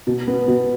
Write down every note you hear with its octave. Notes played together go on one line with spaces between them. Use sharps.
B2
B3
B2